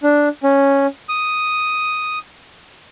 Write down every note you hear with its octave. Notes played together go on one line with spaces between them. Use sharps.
D4
C#4
D#6